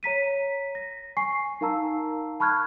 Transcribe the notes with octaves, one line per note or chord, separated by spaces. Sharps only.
C#5 A#5 B6 D#7
A#6
G#5 C#6 C7
D#4 A#4 F5 A5 A#5 E6
A5 B5 C#6 F6 F#6 G#6